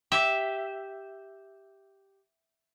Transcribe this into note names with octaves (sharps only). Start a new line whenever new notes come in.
G4 E5